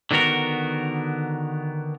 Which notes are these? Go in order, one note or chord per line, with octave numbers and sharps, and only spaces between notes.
D3 D#3 B3 F#4 A#4